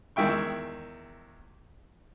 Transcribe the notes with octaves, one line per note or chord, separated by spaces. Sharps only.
E2 D#3 G#3 E5 G5 C#6